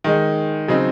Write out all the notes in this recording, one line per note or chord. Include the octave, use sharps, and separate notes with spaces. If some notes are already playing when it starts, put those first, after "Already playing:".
D#3 G#3 D#4
C#3 F#3 C4 D#4